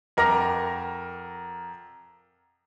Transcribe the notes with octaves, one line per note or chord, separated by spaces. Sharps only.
F2 A#4 F#5 D6 A#6 F7